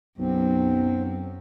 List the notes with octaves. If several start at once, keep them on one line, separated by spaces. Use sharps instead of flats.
B1 F#2 C4